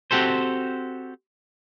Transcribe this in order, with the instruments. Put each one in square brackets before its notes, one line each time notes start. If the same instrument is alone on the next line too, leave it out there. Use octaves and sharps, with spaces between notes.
[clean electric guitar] C4 F#4 G4 A4 C5